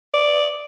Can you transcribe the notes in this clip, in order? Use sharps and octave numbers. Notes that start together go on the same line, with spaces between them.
D5